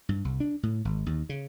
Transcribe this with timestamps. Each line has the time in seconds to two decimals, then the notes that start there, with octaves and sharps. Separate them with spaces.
0.09 G2
0.25 C2
0.40 D4
0.63 A2
0.85 G#1
1.06 D#2
1.29 C#3